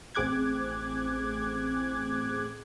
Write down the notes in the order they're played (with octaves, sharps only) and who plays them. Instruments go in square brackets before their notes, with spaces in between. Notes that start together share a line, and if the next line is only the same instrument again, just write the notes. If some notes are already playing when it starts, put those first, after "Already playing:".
[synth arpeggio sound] A1 C4 G#4 D6 F#6 G#6